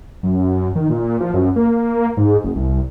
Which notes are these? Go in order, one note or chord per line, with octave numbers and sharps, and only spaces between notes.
F#2
D#3
A#2
F3
F#2
A#3
G#2
F#1
C2